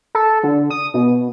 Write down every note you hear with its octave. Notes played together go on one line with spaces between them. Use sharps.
A4
D3
D#6
B2